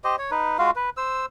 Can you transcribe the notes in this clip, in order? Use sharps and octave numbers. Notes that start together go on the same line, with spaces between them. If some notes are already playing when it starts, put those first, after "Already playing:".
G4 C5 D#5
C#5
D#4 B4
G#3 F4 F#4 F5
B4
C5 E6